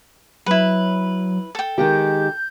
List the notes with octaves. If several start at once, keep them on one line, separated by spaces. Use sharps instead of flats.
F#3 E4 B4
A4 G5
D#3 G#3 G4 G6